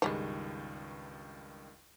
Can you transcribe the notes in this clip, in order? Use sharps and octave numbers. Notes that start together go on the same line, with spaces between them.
C#2 G2 D#3 F3 G3 G#3